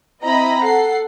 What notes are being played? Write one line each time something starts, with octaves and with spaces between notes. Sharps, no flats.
C4 E4 D#5 A#5 B5
A4 F#5 C7